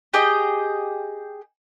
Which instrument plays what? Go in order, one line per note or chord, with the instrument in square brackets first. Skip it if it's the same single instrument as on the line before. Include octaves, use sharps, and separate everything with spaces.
[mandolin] G4 G#4 D#5 G5